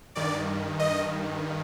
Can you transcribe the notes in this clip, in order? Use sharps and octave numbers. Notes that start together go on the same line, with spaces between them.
G2 D#3 D5
D#5